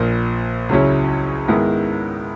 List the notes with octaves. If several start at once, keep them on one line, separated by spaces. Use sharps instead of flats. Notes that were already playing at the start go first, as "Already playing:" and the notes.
Already playing: A#1 A#2 A#3
C#2 C#3 F#3 C#4 E4
G#2 D#3 G#3 B3 E4